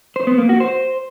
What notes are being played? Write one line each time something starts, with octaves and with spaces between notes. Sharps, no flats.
C5
B3
A#3
F#4
C5